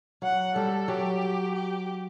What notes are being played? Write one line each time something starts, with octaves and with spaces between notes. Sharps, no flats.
F#3 F#5
G3 A4
F#3 G4
G4